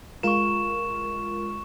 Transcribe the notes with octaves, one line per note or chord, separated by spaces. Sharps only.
G#3 F4 A#4 C#6 E7